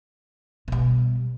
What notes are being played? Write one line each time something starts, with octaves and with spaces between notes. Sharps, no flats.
B2 G3